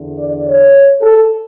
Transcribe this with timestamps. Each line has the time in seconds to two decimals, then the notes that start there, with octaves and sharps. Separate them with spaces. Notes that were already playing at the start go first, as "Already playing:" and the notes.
Already playing: E2 D3
0.16 D5
0.44 C#5
1.01 A4